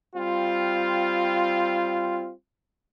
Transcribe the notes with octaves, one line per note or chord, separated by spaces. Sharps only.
G3 C4 F4